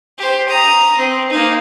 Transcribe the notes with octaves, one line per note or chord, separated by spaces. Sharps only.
G4 C5
A#5 D#6
C4
A#3 D#4